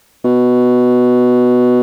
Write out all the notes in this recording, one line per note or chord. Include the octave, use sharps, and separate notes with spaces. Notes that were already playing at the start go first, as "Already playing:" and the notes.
B2